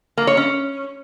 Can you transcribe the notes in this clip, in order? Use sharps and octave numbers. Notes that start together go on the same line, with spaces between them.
A#3
C#5
C#4